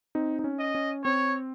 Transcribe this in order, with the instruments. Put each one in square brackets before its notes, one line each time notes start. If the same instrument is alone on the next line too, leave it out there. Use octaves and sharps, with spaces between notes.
[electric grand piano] C4 D#4
D#4
C#4
[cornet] D#5
[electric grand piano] C#4
[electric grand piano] C4 [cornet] C#5